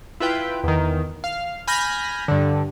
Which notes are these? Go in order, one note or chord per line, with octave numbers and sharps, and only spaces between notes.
E4 F4 B4 G5
E2 D#3
F5
G#5 B5 F6 G6 A#6
G2 D3